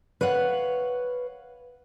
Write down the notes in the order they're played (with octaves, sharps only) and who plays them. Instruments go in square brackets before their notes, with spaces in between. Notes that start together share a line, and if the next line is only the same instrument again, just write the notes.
[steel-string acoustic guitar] B4 C#5 F5 F#5